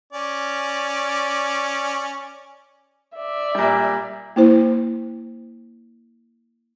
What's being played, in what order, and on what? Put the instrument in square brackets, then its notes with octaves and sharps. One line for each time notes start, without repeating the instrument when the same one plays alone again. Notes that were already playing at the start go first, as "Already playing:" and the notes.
[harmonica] C#4 D5
[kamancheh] D5 E5
[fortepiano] A#2 G3
[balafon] A#3 E4 C5